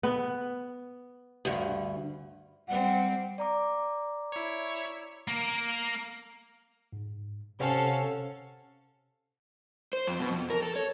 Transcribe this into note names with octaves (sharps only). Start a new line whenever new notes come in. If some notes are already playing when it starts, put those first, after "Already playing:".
B3
D2 G2
G3 C4 F#5
D5 A#5 D6
E4 C#5
A#3 A#4
G#2
C3 C#4 A4 C5 F5 F#5
C5
F2
B2
F2
A#4
A4
C#5